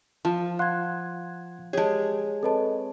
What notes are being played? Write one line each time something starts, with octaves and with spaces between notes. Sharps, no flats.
F3 A5
F5 F#5 C6 F#6 G#6
G#3 G4 G#4 C#5 A5
C4 A4 B4 C#5 D#5 A5